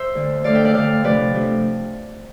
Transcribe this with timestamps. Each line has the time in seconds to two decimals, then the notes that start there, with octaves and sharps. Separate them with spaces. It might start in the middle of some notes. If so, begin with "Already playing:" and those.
Already playing: C5 E5
0.15 D2 D3 A3
0.44 D2 D3 A3 D5 F5
0.55 E5 G5
0.64 D5 F5
0.74 D2 D3 A3 D5 F5
1.04 C3 F3 A3 D4 B4 D5
1.34 C3 F3 A3 D4